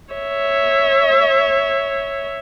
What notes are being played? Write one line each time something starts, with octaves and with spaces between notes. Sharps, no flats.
C#5 E5